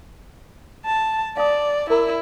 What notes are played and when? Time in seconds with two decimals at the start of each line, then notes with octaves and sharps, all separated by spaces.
0.86 A5
1.37 D5 F5 A5 D#6
1.90 E4 A#4 A#5